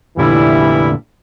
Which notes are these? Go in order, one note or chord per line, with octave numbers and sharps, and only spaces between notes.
F1 A#2 D3 E3 G3 E4